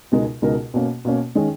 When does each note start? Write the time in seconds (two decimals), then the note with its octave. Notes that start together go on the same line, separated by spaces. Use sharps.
0.12 C#2 B2 G#3 D#4 A#4
0.42 C#2 B2 G#3 D#4 A#4
0.74 B2 A#3 C#4
1.05 B2 A#3 C#4
1.35 D#3 G#3 C#4 G#4